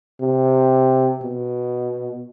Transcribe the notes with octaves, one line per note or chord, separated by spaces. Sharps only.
C3
B2